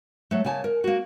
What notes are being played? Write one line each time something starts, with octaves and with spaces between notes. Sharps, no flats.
F#3 A3
C#3 A#3 G#5 A5
A#4
A#3 F#4